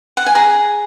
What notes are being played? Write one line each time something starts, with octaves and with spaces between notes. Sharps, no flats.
F#5
G#5
G#4 A#5